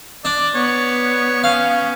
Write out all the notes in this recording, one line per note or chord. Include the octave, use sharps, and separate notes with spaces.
D4 D5
B3 C#5
C#4 F5